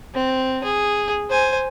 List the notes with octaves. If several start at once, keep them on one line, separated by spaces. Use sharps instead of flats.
C4
G#4
C5 G#5